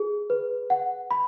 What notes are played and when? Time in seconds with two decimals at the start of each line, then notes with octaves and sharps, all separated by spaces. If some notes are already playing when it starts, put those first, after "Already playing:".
Already playing: G#4
0.30 B4
0.70 F#5
1.11 B5